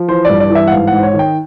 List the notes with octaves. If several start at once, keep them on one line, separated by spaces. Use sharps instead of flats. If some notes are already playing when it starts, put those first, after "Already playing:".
Already playing: F3
E3 C5
G2 D5
D5
E3
E5
F#5
G#2 F5
G#2 F#5
C5
C#5
D#3
G5